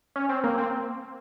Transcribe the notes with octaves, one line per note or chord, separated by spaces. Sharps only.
C#4
C4
A#3
C4